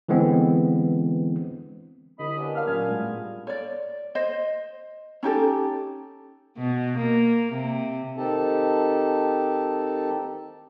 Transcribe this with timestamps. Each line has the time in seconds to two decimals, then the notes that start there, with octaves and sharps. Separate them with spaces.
0.08 D3 E3 G#3 B3 C4
2.19 C2 D3 E4 D#5 B5
2.37 A#3 B3 C#4 D4 G4
2.56 A3 B3 A#4 F5 F6
2.67 A#2 F#3 C#4 G#5
2.90 A2 G3 G#3
3.47 C#5 D5
4.15 C5 D#5
5.23 C#4 D#4 G4 A4
6.57 B2
6.98 A#3
7.53 C3
8.17 D#3 C4 D#4 G4 A4 A5